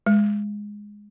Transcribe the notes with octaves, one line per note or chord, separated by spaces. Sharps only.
G#3